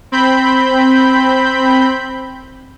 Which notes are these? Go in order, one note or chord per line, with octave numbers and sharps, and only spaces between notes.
C4 B5 G6